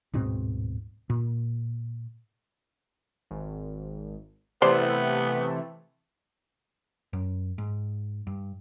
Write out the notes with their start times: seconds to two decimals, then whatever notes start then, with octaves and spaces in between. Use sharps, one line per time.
0.13 D1 G#2 B2 C4
1.10 A#2
3.31 G#1
4.62 C3 E3 A3 B3 C5 D5
7.13 F#2
7.58 G#2
8.27 G2